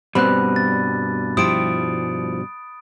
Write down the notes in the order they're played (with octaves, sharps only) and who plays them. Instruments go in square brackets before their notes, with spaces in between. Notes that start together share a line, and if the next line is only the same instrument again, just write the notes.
[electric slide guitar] G2 B2 G3 [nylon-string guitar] B3 C4 [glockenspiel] B5 F#6
[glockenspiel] A6
[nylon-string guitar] F3 E4 G4 [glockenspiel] D#6 D7